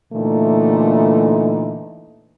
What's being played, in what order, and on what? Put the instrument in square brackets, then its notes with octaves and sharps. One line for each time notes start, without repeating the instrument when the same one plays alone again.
[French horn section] A#2 D3 E3 A3 D#4